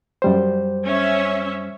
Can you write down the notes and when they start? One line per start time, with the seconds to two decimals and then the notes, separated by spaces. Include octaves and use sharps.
0.22 F#2 G3 C5
0.85 C#4 E5